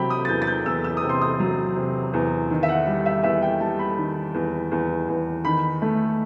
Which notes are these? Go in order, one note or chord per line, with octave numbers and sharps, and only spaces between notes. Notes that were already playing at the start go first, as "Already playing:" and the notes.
Already playing: C3 F#3 G5 B5
D#6
A6
E2 G6
A6
G6
E2 E6
E6
D#6
C3
C6
D#6
F#3
C3
E2
D#3
E5
F#5
G3
E5
E2 E5
G5
G3 A5
B5
D#3
E2
E2
E2
D#3 B5
A3